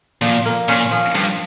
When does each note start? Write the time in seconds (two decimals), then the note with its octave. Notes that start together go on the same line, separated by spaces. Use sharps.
0.22 A#2 F3
0.45 A#3
0.68 A#2 C#4
0.91 F3
1.15 G2 F3